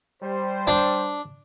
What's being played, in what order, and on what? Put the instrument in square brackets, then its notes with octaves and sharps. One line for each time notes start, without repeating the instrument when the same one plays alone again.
[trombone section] G3 C5
[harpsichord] D4